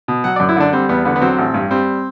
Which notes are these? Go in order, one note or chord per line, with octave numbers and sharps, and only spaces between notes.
B2
F#3 F#5
D5
F#2
E4
D3 D4
G3 C4
E2 B3
D3 B3
B3
F#3 C4
A1
G2
G3 C4